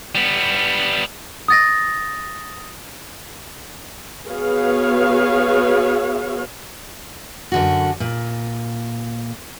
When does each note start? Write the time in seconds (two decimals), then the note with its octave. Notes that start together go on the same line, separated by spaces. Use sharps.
0.15 G3 B3
1.48 D#6 A6 A#6
4.27 B3 F#4 G#4 B4 C#5 F5
7.52 F#2 D3 F#4
8.00 A#2